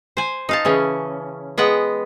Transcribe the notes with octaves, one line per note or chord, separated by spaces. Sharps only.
C5 G#5
D#4 F5 A5
C#3 E3 C#4
G#3 B3 F#5 G5